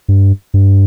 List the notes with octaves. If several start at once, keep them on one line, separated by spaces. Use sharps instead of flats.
G2
G2